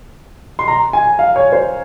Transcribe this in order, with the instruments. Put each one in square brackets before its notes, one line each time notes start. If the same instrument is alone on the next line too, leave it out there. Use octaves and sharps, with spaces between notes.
[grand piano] C6
A#5
G#5
F5
C#5
C5